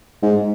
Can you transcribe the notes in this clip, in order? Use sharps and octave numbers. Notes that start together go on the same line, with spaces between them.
G#2